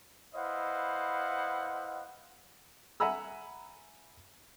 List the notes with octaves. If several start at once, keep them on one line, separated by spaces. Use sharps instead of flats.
E4 B4 C5 D#5 F5 F#5
E5 F#5 G#5 A#5 B5 E6